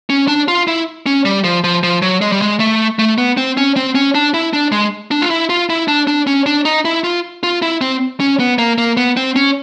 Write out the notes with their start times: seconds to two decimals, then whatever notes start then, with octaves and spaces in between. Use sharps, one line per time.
0.10 C#4
0.28 D4
0.48 F4
0.68 E4
1.06 C#4
1.25 G3
1.44 F3
1.64 F3
1.83 F3
2.02 F#3
2.21 G#3
2.32 G3
2.42 G#3
2.60 A3
2.99 A3
3.18 B3
3.37 C4
3.57 C#4
3.76 C4
3.95 C#4
4.15 D4
4.34 E4
4.53 D4
4.72 G#3
5.11 D4
5.22 F4
5.30 E4
5.49 F4
5.70 E4
5.88 D4
6.07 D4
6.27 C#4
6.46 D4
6.65 D#4
6.85 E4
7.04 F4
7.43 F4
7.62 E4
7.81 C4
8.20 C#4
8.40 B3
8.58 A#3
8.78 A#3
8.97 B3
9.17 C4
9.36 C#4